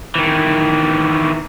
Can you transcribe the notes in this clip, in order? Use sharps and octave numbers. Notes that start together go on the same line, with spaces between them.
D#3 E3